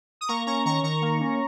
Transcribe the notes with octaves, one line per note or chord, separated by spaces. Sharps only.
D#6
A#3 A#5 C#6
C#4 A#5 C#6
D#3 A#5 C#6
D#3 A#5 C#6
A#3
C#4